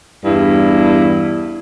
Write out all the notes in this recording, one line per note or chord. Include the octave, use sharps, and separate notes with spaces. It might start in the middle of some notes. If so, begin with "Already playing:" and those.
E2 G2 E4